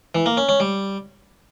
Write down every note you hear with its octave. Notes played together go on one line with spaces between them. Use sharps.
E3
A#3
C#4
C#4
G3